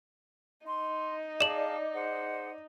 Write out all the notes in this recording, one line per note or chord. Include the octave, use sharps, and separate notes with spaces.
D#4 C6
G#4 D5 F5 A5 E7 F#7
G#4 C5 F#5